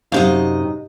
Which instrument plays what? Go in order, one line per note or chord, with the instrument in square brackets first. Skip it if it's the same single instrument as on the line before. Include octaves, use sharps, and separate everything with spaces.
[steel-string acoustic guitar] F#2 C3 D#5 [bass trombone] D#4 [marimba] G4 F5